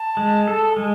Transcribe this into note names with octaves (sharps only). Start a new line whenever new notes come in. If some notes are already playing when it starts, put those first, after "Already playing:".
Already playing: A5
G#3
A4
G#3